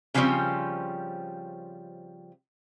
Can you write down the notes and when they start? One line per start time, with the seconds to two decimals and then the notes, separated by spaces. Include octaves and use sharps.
0.14 C#3 E3 F3 G3 C4 C#4